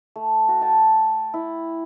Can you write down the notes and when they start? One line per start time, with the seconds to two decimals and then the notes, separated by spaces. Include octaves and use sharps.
0.16 A3
0.48 F#4
0.61 G5 A5
1.34 E4